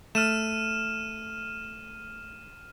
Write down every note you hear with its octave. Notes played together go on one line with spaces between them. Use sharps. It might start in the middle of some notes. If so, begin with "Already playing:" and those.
A3 F6 D#7 E7